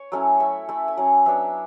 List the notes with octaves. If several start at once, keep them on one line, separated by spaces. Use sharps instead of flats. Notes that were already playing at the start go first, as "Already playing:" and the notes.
Already playing: C#5
F#3 A3 C#4 E4
A3 E4 E5
A3 E4 F#5
G#5
F#3 C#4 E4 F#5
F#3 B3 D4 E5